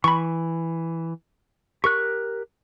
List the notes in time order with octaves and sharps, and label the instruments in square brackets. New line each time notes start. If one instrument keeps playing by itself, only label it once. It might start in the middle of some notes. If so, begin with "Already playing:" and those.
[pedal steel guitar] E3 [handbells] B5 C#6
[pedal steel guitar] G4 A#4 F#6 [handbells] C#6